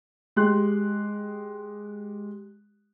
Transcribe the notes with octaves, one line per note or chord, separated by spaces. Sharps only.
G#3 G4 C6 F#6